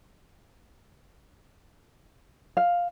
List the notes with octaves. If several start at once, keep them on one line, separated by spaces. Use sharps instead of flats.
F5